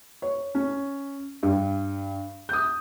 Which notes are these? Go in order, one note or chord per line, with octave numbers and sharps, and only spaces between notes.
C#5
C#4
G2
D#6 G6